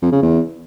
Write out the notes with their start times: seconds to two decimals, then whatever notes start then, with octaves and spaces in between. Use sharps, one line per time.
0.02 F2
0.12 C#3
0.22 E2